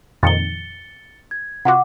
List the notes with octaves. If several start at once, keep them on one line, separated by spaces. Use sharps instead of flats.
F2 A#2 D#3 A6 C#7 G7
G#6
C3 F4 F#4 F#5 D6